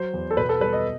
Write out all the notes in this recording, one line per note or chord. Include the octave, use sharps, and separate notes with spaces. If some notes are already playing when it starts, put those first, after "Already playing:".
Already playing: F#3 C5
E2
A4
B2 B4
A4
G3 B4
D#5